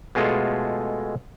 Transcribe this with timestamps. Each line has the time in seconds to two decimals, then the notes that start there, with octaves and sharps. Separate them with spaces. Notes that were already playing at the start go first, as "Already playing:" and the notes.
0.15 B2 G#3 A3 F4 G#4 A4